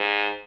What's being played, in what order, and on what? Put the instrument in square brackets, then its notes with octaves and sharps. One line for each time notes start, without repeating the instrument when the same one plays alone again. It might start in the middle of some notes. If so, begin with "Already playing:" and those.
Already playing: [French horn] G#2